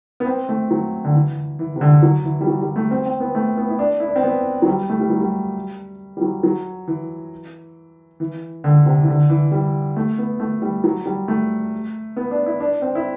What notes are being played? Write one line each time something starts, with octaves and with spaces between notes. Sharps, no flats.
B3
C4
A3
F#3
D3
E3
E3
C3
D3
F#3
E3
G3
F#3
G3
A3
C4
C4
B3
A3
B3
E4
D4
E4
D4
C4
B3
F#3
G3
A3
G3
F#3
G3
G3
F#3
F#3
E3
E3
D3
C3
E3
D3
E3
G3
A3
B3
A3
G3
F#3
G3
A3
B3
D4
E4
D4
C4
E4